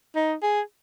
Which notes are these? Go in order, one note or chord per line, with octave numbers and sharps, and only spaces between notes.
D#4
G#4